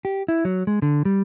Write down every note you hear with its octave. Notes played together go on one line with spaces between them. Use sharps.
G4
E4
F#3
G#3
D3
G3